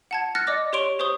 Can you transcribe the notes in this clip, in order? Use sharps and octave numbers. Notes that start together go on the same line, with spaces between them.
F#5 A5 G#6
F6 F#6 A6 A#6 C#7
D5 D#5 D6 A#6
G4 C#5 C6 C#6 D7 F7
G4 C5 C#6 D#6 G7